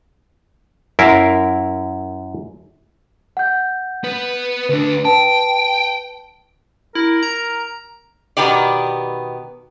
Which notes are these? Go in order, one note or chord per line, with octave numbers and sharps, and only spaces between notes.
F#2 E4 A#4 F5
F#5 G6
B3 B4
D2 D4 B4
B4 G5 A5
E4 A#4
A#5
B2 D#3 B3 G4 D5